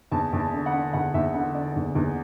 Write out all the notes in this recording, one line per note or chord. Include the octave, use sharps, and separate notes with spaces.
E2 A5
E2
A5
D3
F#5
D3
E2 F#5
E2 E5
D3 F#5
D3 D5
E2
E2